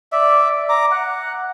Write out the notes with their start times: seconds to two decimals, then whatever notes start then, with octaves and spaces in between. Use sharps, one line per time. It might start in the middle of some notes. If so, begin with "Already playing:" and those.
0.12 D5 E5
0.69 A#5 D6
0.91 F#5